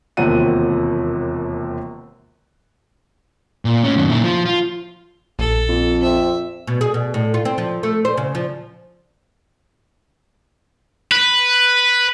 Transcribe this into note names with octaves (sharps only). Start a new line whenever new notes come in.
E1 D#2 C3 F3 F#5 D#7
A#2
A2 C#4
F#2 D#3
A#2 E4
F3
F4
A#1 A4
F2
C4 E5
B2
G#4
B2
A2
F4
C4
F3
A3
C5
C#3
F3
B4